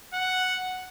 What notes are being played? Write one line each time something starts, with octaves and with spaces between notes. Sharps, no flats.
F#5